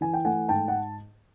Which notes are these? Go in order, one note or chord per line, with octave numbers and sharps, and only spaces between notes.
E3 G#5
G5
A3 F#5 G#5
G#2 G5 A5
F#5